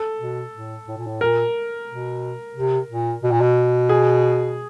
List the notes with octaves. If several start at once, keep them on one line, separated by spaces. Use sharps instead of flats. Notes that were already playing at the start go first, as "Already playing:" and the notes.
Already playing: A4
B2
A2
A2
A#2
A2
A#2 A#4
B2
C3
A#2
B2
A#2
B2
G#4